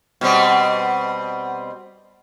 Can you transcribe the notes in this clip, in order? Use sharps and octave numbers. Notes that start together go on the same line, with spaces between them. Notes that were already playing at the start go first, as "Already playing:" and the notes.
B2 G3 C4